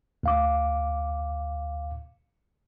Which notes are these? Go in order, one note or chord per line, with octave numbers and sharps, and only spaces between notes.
D2 F5 D6